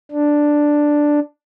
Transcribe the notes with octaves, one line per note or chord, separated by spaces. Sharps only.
D4